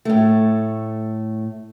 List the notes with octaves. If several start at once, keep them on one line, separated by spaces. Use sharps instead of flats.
A2 A3